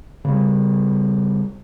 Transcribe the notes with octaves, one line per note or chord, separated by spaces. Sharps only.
C#3 G3